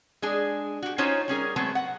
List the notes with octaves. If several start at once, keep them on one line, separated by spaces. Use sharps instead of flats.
G#3 D4 G#4
F#4 G4
C#4 D#4 F4 F#4 C5 C#5
G3 C#4 G#4 A#4
F#3 G#3 A3 B3 C4
F#5